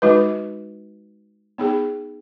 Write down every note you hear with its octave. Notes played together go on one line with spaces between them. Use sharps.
G#3 D#4 F#4 B4
B3 D#4 G#4